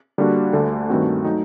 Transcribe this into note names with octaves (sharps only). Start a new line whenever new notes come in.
D3 G3 A#3 D4 F#4
D2 D3 A3 D4
G2 D#3 A3 C4 F#4
F#3 A3 D#4